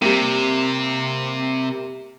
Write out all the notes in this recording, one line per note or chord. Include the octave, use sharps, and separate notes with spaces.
C3 G3 A#3